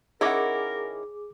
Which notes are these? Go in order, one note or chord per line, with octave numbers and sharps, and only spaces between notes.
D#3 C#4 E4 G#4 A#4 D#5 F#5 D6